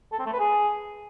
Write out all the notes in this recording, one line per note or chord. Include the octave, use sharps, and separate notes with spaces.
A4
C4
A3
B4
G#4